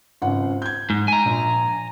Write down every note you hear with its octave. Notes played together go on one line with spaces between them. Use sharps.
G#1 C#2 F#5
G6 G#6
G#2
G#5 A#5
A#1